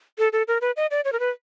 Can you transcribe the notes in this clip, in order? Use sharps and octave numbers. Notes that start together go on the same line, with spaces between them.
A4
A4
A#4
B4
D#5
D5
C#5
A#4
B4